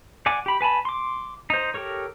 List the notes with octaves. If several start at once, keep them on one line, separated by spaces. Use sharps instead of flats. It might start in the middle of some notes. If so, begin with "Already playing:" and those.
D5 F#5 G#5 D6
G4 B5
B4 G#5 A5 B5
C6 D6
D#4 C5
G4 A4 A#4 C#5